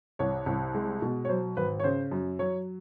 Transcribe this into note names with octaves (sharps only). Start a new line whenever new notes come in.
C2 C#5
C2
G#3
B2
C#5
F#3 C5
G#1 B4
C#5
C#3 C5
F#2
F#3 C#5